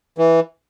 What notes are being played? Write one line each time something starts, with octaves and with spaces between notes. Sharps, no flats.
E3